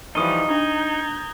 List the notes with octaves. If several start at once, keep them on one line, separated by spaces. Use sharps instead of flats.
E3 F3 G3 D#4 C#6 D#6 D#7 G7
D4 A#5 G6 G#6